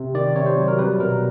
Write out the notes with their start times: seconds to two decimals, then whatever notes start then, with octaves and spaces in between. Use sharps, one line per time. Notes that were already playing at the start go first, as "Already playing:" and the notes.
Already playing: C3
0.14 D#3 D5
0.36 C3 C#5
0.46 C5
0.57 F#3
0.68 A#4
0.78 G3 B4
1.00 B2 A#4